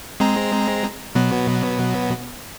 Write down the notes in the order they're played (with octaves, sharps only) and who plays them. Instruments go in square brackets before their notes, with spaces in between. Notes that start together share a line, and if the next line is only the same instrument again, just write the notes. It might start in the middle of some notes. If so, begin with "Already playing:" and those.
[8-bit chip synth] G#3 C4 A#5
B2 F#3 B3